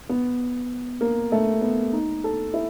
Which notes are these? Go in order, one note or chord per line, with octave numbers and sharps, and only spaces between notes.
B3
A#3
A3
B3
D#4
A4
E4